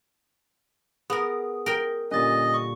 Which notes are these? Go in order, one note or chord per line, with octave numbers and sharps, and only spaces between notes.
B3 G#4 A#4
A#4 G5
A#2 D3 G3 C#4 D#5 A6
C#6